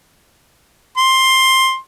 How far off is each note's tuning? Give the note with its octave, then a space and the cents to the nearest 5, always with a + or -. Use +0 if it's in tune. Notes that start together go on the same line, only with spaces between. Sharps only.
C6 +10